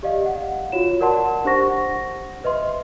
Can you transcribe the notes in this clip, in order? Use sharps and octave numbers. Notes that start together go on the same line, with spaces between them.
G4 D5 D#5 F5
F#5
F4 F#4 C#5 E7
A#4 D5 F#5 A5 C6
D4 G4 C5 F#5 C#6 A#6
B4 D#5 E5 C6